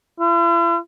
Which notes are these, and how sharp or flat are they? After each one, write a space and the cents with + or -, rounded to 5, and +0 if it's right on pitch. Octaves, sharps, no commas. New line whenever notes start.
E4 +45